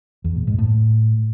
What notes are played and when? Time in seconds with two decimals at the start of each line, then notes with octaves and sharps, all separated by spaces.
0.24 E2
0.36 A#2
0.47 G#2
0.58 A2